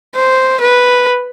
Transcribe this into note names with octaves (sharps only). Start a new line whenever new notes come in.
C5
B4